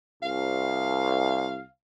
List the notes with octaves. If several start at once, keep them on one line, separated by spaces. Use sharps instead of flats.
C2 F5